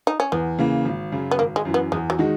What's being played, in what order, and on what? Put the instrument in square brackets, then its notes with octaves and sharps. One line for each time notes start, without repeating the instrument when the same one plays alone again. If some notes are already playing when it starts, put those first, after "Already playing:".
[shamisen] D#4
C#4
[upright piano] E2 [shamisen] B3
[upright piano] C#3 E3 A#3
G#1
F#2 C#3
[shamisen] B3
[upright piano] G#1 [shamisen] A#3
[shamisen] G#3
[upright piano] F#2 E3
[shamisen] B3
[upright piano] E2 [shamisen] G#3
[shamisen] F#3
[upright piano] D#3 G#3 D#4 F#4